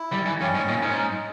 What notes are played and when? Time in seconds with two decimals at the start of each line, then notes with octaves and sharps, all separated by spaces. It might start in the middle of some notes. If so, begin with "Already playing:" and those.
Already playing: E4
0.12 G3
0.26 E3
0.40 G2 C#4
0.55 G#2
0.68 A#2
0.83 G#2
0.88 C#4
0.97 D#4